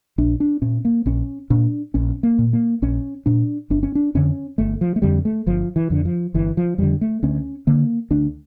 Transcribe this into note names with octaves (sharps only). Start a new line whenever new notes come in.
A#1 D4
D4
A#2 C#4
A#3
A#1 C#4
A#2 D4
A#1 C#4
A#3
A#2
A#3
A#1 C#4
A#2 D4
G1 D4
C#4
D4
F2 D3 C#4
G1 A3
F3
A3
F2 D3 G3
A3
G1 F3
E3
F2 D3
F3
G1 E3
F3
F2 D3 G3
A3
D2 C#4
D3 A#3
D2 D4